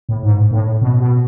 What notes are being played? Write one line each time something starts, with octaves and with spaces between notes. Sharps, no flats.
A2
G#2
A2
B2
B2